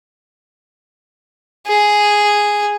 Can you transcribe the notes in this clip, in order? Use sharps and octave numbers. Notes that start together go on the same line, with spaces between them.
G#4